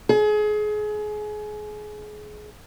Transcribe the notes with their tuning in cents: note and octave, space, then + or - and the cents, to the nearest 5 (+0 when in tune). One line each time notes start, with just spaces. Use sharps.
G#4 +25